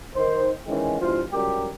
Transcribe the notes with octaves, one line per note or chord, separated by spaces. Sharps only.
D#3 C5
D#3 E3 G#3 C4 C#4
G2 B2 E3 F4 C5
C#2 F#3 G3 G4 A#4